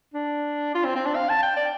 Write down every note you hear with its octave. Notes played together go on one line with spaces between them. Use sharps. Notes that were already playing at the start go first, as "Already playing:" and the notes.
D4
F4
C4
C4
D4
F5
A5
G5
D5